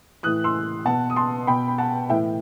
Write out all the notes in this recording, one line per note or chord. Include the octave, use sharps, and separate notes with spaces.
A2 E3 D#6 F#6
C6 E6
B2 F#5 A5
D#6
A5 C6
B2 G5 B5
B5
F#5 A5
A2 E3 E5 G5